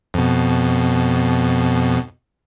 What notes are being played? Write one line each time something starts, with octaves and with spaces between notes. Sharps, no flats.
F2 B2